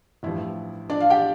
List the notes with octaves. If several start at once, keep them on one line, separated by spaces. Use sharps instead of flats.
A1 G2 F3 E4
D4 D5
F4 F5
G4 G5